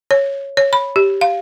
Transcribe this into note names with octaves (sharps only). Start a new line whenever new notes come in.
C#5
C#5
B5
G4
F5